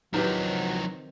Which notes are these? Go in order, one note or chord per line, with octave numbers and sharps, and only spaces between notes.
D#3 F3 F#3 C4 D#4 E4 G4 B4